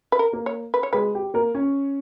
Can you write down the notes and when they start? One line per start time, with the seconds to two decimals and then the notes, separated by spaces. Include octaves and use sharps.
0.12 B4
0.19 A#4
0.33 A#3 A#4
0.46 C#5
0.74 B4
0.83 C#5
0.93 G#3 G#4 B4
1.15 G4
1.34 A#3 A#4
1.55 C#4 C#5